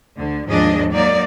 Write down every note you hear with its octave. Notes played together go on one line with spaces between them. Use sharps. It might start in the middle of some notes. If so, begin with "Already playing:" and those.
D2 D3
D#2 G#2 F3 D4 G#4 D#5
F#3 A#3 D#4 D5